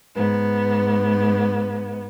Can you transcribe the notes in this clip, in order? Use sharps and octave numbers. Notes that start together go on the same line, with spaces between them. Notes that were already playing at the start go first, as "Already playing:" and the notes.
G#2 B3